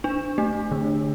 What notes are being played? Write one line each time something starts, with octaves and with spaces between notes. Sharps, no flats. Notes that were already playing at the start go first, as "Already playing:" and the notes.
D4
A3
D3